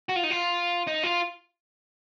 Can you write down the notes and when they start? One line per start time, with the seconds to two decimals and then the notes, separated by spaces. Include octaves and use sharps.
0.09 F#4
0.16 F4
0.23 D#4
0.30 F4
0.87 D#4
1.03 F4